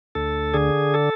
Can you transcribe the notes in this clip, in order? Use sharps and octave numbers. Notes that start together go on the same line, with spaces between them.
D2 A4
D3 G#4
A4